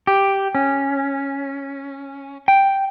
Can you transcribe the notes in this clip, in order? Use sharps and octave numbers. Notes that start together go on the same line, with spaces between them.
G4
C#4
G5